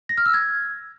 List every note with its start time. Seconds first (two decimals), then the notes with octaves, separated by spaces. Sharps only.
0.09 A#6
0.17 F6
0.26 E6
0.34 G#6